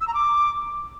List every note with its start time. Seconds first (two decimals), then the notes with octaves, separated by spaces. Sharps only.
0.01 E6
0.07 A#5
0.14 D6